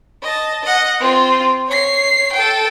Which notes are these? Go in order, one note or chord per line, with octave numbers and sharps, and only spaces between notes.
D#5 A5
D#5 F#5
C4 F4
C#5 C7
A4 G5